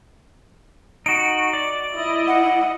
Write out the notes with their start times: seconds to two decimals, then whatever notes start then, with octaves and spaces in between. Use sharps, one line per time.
1.06 D#4 F#4 D7
1.53 D5
1.93 E4 D#5
2.27 F#5